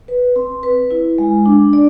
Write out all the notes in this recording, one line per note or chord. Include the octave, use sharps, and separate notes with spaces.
B4
C4
B4
E4
G#3
D4
D5